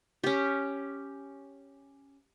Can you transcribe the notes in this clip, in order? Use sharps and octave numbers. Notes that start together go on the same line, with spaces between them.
C#4 G4